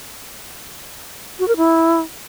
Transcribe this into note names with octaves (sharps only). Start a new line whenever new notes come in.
F#4
A#4
E4